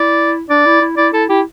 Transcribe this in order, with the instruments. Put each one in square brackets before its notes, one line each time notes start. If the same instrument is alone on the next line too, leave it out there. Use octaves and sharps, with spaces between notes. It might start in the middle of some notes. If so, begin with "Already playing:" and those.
Already playing: [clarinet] E4 [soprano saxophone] D5
[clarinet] D4 [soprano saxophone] D5
[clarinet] E4
E4
[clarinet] E4 [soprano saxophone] D5
[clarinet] E4 [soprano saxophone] A4
[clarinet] E4 [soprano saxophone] G4